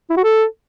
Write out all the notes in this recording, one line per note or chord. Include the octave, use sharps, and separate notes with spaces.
E4
F#4
A4